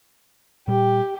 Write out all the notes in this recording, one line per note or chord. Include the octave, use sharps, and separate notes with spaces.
A#2 G3 G4